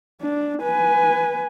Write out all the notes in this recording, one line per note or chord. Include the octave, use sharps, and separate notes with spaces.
D4
B4 G#5